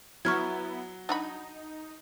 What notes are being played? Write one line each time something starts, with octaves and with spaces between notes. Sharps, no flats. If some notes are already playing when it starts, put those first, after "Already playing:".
F#3 B3 E4 C#6 F6 G#6
D4 D#4 F#4 B5